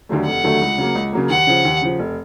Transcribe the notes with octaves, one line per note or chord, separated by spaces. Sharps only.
D#2 D3 F#3 A3
F1 F#5
D#2 D3 F#3 A3
C#2
C#3 F#3 A#3
C#2
C#3 F#3 A#3
D#2 F#5
C#3 F3
D#2
C#3 F3
F1